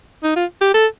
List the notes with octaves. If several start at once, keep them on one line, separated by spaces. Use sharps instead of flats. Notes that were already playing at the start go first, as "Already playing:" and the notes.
D#4
F4
G4
A4